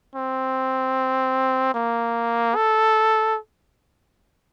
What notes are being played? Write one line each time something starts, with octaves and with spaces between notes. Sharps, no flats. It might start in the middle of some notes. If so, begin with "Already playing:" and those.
C4
A#3
A4